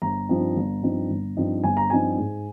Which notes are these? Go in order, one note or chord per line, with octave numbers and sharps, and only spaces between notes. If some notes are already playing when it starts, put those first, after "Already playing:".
G1 A#5
G2 F3 C4 D#4
G1
G2 F3 C4 D#4
G1
G2 F3 C4 D#4
G1 G#5
A#5
G2 F3 C4 D#4 G#5
G#2